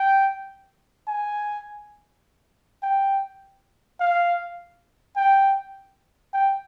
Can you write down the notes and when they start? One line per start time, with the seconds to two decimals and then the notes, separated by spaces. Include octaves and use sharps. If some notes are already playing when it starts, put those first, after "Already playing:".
Already playing: G5
1.08 G#5
2.83 G5
4.00 F5
5.17 G5
6.34 G5